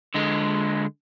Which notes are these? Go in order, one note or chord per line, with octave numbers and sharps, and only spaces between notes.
D3 G#3